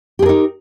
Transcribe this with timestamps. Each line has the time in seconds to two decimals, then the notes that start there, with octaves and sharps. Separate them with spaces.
0.19 G4
0.22 G#4
0.26 A#4
0.29 D#4